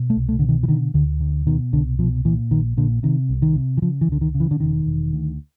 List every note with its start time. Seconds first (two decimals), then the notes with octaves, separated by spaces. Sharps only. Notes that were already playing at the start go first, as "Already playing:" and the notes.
Already playing: B2
0.10 A3
0.16 C2
0.29 A3
0.39 B2 D3
0.49 D#3
0.63 E3
0.68 D3 D#3
0.94 D2 D3
1.20 D3
1.46 B2 D#3
1.73 C2 D3
1.99 B2 F3
2.25 A#2 E3
2.51 A#1 D#3
2.77 A#2 D3
3.03 C3 D#3
3.29 C2
3.42 D#3
3.56 C3
3.77 E3
3.82 C#3 F3
4.01 E3
4.08 C#2 D3
4.21 D#3
4.35 C#3
4.40 E3
4.51 D3
4.60 E1 D#3
4.86 E1
5.13 D2